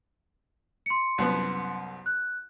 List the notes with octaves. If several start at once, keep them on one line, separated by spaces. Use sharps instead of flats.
C6 C#7
C2 F#2 B3
F#6